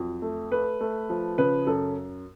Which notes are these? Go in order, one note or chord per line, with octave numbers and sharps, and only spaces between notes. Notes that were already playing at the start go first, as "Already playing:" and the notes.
Already playing: F2 F#3
A3
A3 B4
A3
F3
C#3 B4
F#2 A4